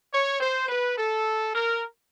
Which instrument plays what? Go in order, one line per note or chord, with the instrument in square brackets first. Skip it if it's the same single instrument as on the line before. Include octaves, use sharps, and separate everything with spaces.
[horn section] C#5
C5
B4
A4
A#4